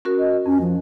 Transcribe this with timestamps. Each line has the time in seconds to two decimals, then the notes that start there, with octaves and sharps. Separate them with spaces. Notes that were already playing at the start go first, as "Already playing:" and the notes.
0.05 C#4 F#4 A#4
0.19 D#5
0.46 F2 C#4
0.61 F3